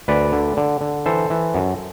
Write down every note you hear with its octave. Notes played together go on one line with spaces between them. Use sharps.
D2 B4 D5
D3
D3
D3
E3 A4 C5
E3
F#2